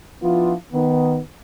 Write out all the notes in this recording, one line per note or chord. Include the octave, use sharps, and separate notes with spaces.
F3 B3 D4 E4 F4
D#3 B3